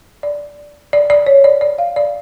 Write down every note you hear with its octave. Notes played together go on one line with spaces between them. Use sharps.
D5
D5
D5
C#5
D5
D5
F5
D5